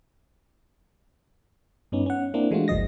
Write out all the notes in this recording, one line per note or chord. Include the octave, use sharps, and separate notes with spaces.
G2 B3 C#4 D#4
C#4 F#5
A#3 C4 D4 E4
E3 G#3 A3 D4 F4 F#4
G1 C#2 F3 D#5 A#6